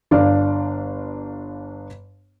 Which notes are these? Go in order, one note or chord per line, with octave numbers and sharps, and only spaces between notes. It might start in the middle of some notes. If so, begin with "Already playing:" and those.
G1 D4 D5 F5